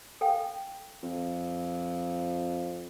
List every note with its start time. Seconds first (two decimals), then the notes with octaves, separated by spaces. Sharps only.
0.21 A4 F5 G5
1.03 F2